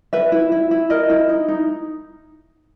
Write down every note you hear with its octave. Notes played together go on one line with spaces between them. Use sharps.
B4 E5
E4
E4
E4
A#4 D#5
E4
D#4
D#4